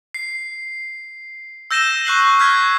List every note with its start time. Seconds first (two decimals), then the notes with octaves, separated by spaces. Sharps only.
0.14 C7
1.71 E6 G6 A#6 D#7 E7 G7
2.05 C#6 F#6 C7 F#7
2.39 F6 G6 G#6 B6